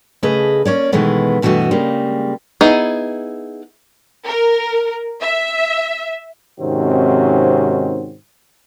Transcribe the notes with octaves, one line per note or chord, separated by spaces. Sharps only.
C#3 A3 G#4 B4 D#5
A#3 C#4 C#5 D5
B2 D#3 E3 G#3 A3 B3
G2 B2 E3 A3 F#4 D#5
C#3 G3 G#3 A#3
B3 D#4 E4 G#4
A#4
E5
G#2 C3 D#3 C4 C#4 F#4